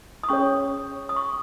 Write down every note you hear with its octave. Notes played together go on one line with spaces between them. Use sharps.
D#6
C#4 G#4 C#5 C#6
D#6
C#6